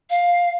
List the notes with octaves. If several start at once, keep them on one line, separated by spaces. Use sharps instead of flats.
F5